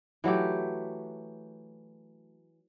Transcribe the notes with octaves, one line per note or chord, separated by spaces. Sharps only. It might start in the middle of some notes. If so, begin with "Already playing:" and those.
E3 F#3 A3 G4